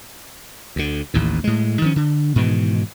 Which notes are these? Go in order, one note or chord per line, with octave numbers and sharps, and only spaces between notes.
D2 D3
A1 D#2 A2
A2 G#3
D#3 F3 C#4
D3
G#2 B2 D#3 E3